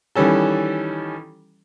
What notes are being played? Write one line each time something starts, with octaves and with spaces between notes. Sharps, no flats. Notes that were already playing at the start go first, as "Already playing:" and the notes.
D#3 E3 G3 C#4 A4